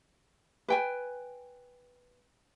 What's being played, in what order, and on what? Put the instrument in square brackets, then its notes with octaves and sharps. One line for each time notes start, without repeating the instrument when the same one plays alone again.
[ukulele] B4 G5 G#5